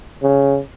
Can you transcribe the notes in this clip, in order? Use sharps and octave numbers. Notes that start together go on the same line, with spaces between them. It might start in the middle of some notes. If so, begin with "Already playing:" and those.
C#3